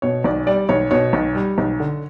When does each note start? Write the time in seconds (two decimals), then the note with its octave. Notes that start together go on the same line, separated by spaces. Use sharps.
0.02 B2 C#5
0.24 B1 D5
0.46 G3 D5
0.69 B1 C#5
0.91 B2 C#5
1.13 B1
1.35 G3
1.58 B1
1.80 D3